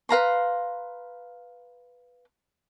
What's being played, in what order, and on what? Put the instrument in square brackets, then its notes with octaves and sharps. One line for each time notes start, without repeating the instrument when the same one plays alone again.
[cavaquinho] B4 F5 A#5 C6